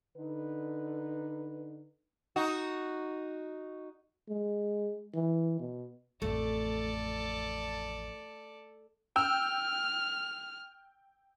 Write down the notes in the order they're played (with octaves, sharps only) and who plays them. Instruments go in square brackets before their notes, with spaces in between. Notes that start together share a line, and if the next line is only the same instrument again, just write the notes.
[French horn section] D3 D#4 B4
[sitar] D#4 F#4
[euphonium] G#3
E3
B2
[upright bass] A1 F2 [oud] A3 [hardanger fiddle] A4 D5
[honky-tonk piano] G5 E6 [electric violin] F6